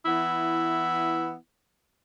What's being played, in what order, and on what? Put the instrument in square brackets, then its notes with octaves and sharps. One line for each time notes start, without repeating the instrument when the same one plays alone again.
[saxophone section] E3 B3 E4